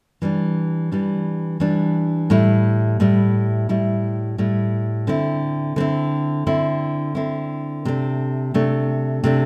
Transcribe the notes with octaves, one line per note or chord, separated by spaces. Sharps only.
E3 G3 D4
E3 G3 D4
E3 G3 D4
A2 G3 E4
A2 G3 E4
A2 G3 E4
A2 G3 E4
D3 C4 E4
D3 C4 E4
D3 C4 E4
D3 C4 E4
C3 A3 D4
C3 A3 D4
C3 A3 D4